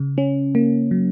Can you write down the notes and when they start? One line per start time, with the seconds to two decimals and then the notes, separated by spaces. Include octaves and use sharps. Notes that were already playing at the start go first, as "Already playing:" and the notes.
Already playing: C#3
0.18 C#4
0.55 A#3
0.91 F#3